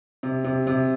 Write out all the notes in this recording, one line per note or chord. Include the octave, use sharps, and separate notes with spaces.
C3
C3
C3